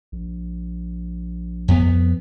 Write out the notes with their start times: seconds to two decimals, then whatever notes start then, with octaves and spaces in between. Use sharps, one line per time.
0.12 A#1
1.68 F2 B3